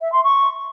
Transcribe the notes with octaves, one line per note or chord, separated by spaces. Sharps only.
E5
C6
C#6